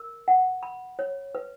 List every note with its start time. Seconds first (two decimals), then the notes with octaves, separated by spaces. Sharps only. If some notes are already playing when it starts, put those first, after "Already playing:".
Already playing: A#4
0.28 F#5
0.63 B5
0.99 C#5
1.35 B4